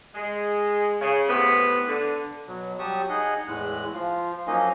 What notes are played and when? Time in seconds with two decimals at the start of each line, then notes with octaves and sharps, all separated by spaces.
0.15 G#3
1.01 C#3
1.29 A2 C3 B3
1.88 D3
2.48 B2 F#3
2.79 F#3 G3 G4 A5 C#6 D#6
3.09 D#4 G#4 D#5 F#5
3.48 E2 A2 G#3 F#6
3.94 F3 F4
4.47 F3 F#3 A#3 C#4 D#4 D#5